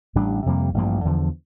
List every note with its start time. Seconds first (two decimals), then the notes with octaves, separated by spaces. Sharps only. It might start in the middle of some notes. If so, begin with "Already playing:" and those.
0.15 A1 A2 G3 D4
0.46 F2 C3 G3 A#3
0.74 A1 G2 F3 A#3
1.05 E2 D3 F3